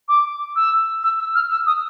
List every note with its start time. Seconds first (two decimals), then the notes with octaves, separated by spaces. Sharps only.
0.08 D6
0.56 E6
1.03 E6
1.19 E6
1.35 F6
1.50 E6
1.66 D#6